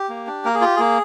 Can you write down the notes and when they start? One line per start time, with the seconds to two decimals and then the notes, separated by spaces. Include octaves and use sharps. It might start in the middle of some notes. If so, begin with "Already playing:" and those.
Already playing: G4
0.09 A#3
0.27 D4
0.45 A#3 A#4
0.54 G#4
0.61 F4 G4
0.76 A#3 G#4